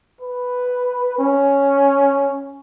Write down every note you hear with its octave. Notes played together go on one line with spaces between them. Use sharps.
B4
C#4